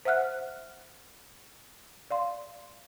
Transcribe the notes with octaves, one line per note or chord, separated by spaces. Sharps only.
C5 E5 F#5 F6 F#6
D5 F5 C6